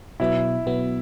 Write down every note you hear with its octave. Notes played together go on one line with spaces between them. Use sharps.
B2 F#3 B3 E4
B2 F#3 B3